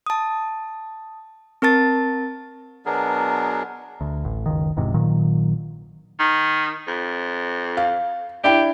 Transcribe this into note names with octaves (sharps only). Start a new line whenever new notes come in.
A5 D#6
C4 A#4 A5 A6
B2 F#3 B3 D4 G#4 A#4
D2
A1
F#1 C#2 D#3
E1 E2 G#2 C3
A#1 A#2 D#3 F#3
D#3
F2
F5
D4 E4 G4 G5